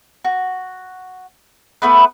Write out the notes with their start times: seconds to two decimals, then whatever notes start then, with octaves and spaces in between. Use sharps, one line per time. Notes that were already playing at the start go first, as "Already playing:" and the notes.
0.25 F#4
1.82 A3 B3 B4